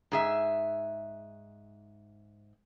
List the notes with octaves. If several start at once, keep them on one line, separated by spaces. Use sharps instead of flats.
G#2 G#4 E5